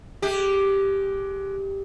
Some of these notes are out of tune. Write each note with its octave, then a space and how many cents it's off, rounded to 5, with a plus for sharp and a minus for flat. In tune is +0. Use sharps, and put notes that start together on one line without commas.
G#3 +30 G4 +0